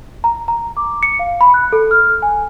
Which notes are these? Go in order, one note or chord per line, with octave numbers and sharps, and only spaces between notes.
A#5
A#5
D6
C#7
F5
B5
F#6
A4
F6
G#5